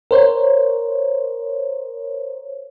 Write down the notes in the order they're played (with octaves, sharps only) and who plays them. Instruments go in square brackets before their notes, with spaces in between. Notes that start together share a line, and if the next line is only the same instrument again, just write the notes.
[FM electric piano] A#4 C5 C#5